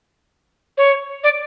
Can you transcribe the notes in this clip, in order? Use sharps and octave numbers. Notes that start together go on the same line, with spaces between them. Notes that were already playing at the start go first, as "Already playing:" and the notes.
C#5
D5